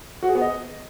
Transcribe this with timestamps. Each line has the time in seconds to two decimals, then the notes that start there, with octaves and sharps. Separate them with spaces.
0.23 F#4
0.29 G#4
0.35 B3
0.41 D#5